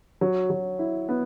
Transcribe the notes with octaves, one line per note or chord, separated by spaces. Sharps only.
F#3
F#3
E4
B3